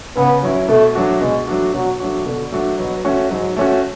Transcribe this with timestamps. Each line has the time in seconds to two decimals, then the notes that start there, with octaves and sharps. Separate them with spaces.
0.16 C#3 B3
0.43 F#3 C#4 E4
0.68 B2 A3
0.95 F#3 A3 D4 F#4
1.21 B2 G#3
1.48 F#3 A3 D4 F#4
1.73 B2 F#3
2.00 F#3 A3 D4 F#4
2.25 B2 D3
2.52 F#3 A3 D4 F#4
2.78 B2 F#3
3.05 A3 C#4 F#4
3.30 G#2 F#3
3.57 A3 C#4 F#4